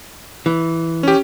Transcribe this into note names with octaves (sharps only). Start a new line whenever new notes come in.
E3
C#4 G4